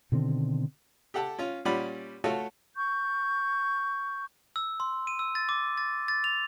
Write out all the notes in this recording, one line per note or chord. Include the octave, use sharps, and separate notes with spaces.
B2 D3 D#3 C4
G4 A4 F#5 G5 A5
C#4 F4
A#2 G3 C#4 D5 F#5 B5
A3 F4 F#4 A4 C#5 F5
C#6 G6
E6
C6
D#7
E6
A6
D6
A6
A6
F7